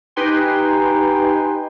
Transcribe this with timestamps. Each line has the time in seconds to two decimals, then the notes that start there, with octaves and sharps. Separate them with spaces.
0.16 D#4 G4 B4 G5 G#5 C6